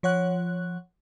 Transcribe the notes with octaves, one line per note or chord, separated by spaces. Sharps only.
F3 C#5 F#5 F#6